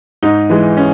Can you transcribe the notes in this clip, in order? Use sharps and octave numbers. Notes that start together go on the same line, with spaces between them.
G#2 D#4
E3 G#3
C#4